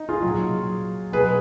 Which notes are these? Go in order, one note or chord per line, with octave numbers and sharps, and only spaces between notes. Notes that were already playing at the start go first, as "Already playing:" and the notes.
Already playing: D#4
F4 G#4
A#2 F#3
B2 F#3 G#4 B4